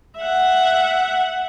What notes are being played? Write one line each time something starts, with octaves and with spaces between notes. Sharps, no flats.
E5 F#5